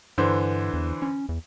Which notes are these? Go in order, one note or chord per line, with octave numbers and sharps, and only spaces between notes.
G2 D3 E3 C5
E2
C#4
E2